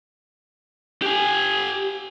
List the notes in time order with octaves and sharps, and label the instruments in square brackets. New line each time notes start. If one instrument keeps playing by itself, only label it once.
[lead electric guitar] G4 G#5